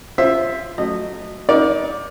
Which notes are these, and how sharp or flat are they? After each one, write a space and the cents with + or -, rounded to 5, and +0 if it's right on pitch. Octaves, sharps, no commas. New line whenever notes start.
F4 -15 C5 +20 E5 +0
F#3 +0 A3 +0 D#5 -20
D#4 +30 A#4 +30 D5 +0